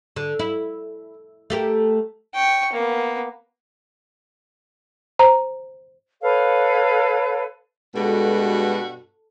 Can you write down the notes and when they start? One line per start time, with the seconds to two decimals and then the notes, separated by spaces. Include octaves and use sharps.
0.16 D3
0.39 E4
1.50 A3 G4 A#4
2.34 G5 C#6
2.73 A#3 B3
5.19 C5 A#5
6.21 A4 B4 C#5 F5
7.96 G2 B2 G#3 F#4 A4